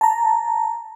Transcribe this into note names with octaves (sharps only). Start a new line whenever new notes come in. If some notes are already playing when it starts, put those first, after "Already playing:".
A5 A#5